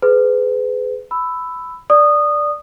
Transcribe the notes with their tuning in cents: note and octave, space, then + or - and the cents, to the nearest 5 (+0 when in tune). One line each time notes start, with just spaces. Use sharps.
G#4 +20 B4 +30
B5 +15 E6 +0
D5 +0 D#6 -20